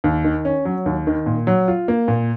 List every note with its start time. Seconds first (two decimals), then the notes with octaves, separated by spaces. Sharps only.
0.04 D#2
0.24 D#3
0.45 C#4
0.65 F#3
0.86 D#2
1.07 D#3
1.26 A#2
1.47 F#3
1.68 F4
1.88 A#3
2.08 A#2